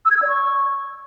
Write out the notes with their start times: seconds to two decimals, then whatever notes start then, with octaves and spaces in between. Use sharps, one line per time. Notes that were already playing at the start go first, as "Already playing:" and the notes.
0.05 E6
0.11 G#6
0.17 E6
0.22 D5
0.28 C#6